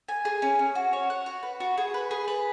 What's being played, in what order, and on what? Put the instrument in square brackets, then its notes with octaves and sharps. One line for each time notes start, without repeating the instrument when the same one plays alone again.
[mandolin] G#5
G#4
C#4
C#4
F#4
C#5
F#5
F#4
B4
F#4
G#4
B4
G#4
B4